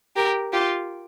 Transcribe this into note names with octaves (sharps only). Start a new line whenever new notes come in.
G4 A#4
F4 G4